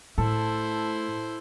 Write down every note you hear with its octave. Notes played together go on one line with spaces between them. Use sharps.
A2 E4 A4 C5